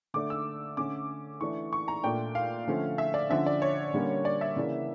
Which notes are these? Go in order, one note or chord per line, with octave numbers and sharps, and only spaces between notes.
D3 A3 D4 D6
E6
D3 A3 C#4 D6
E3 A3 D4 C#6
C#6
A#5
A#2 A3 D4 G5
F5
D3 F3 A3 C#4
E5
D5
D3 F3 C#4 E5
D5
C#5
D3 G3 A#3 C#4
D5
E5
C#3 E3 A#3 D4